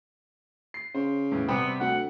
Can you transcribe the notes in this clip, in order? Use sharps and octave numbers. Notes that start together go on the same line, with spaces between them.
C7
C#3 C5
E2 A2
C3 G3 B3 C4
D2 F#5